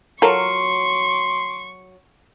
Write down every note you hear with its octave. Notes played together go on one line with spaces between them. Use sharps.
F#3 F4 A4 A#4 C6 C#6